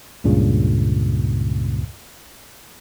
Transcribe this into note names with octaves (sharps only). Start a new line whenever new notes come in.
C#2 G2 A#2 C#3